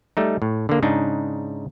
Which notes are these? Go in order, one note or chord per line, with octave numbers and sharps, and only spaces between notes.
G3 A3 D#4
A2
D3 A#3
G#2 C#3 D4 D#4